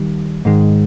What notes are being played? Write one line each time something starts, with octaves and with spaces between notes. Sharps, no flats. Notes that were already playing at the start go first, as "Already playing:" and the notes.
Already playing: D#3 G3
G#2 D#3 G#3